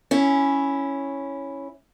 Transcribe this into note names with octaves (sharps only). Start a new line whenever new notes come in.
C#4 E4